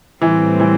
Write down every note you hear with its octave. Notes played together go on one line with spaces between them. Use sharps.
A2 E3 G3 C4
E3